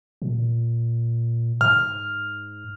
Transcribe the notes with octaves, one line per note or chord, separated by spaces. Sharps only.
A#2
G#2 F6